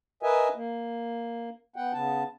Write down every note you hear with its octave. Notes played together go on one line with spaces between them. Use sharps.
A#4 B4 D#5 E5 G#5
A#3
B3 F#5 G5
C#3 B3 A5